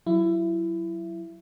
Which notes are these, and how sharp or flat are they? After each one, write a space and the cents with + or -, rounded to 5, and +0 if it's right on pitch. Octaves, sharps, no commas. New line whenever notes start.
F#3 +5 E4 +20